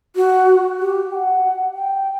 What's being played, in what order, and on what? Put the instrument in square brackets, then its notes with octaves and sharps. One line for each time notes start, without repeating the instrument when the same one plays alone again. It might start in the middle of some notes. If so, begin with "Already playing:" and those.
[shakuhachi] F#4
G4
G5
F#5
G5